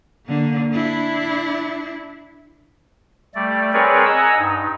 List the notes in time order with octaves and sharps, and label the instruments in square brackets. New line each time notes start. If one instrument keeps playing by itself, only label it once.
[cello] D3 A#3
D4 E4
[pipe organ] G3 A3 D5
C4 G#4 A#4 B4 C#5 D5
D#5 F#5 G#5 A#5 E6
G2 D#4